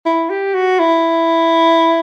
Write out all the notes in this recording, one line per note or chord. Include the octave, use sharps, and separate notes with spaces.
E4
G4
F#4
E4